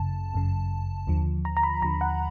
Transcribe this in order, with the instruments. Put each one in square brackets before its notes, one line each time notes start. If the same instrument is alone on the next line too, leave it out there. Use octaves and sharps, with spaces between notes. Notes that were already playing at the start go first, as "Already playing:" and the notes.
Already playing: [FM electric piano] G1 F#2 C#3 A5
G1 F#2 C#3
D#2 D3 F3
A#5
A#5
B5
D#2 D3 F3 A#5
F#5